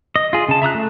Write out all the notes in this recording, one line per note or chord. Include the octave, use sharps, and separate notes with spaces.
D#5
F4 G#4
C#3 A5
E5 A#5 D#6 F#6
A3